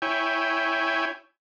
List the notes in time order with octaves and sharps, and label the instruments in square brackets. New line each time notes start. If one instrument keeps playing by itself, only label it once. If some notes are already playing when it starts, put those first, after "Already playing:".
[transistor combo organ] E4 C#5 G5 G#5